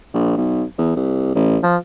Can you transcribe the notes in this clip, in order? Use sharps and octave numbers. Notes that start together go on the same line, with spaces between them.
A#1
B1
E2
C2
A1
F3